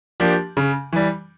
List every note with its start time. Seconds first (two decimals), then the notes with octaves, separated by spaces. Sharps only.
0.20 F3 A#3 D4 G4
0.57 C#3
0.93 E3 G3